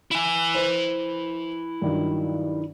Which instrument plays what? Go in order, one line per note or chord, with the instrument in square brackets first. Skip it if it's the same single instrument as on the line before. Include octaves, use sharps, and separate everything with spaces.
[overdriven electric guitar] E4 G#5
[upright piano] C5 B5
G2 D#3 F#3